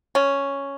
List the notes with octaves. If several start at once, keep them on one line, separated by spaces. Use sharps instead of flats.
C#4